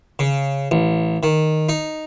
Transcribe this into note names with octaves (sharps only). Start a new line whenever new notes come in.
C#3
A1
D#3
D#4